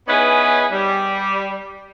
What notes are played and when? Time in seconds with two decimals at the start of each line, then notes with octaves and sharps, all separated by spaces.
0.08 B3 C#4 D#4 E4 G#4 B4
0.72 G3